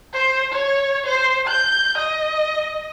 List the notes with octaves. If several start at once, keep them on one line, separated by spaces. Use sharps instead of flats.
C5
C#5
C5
G6
D#5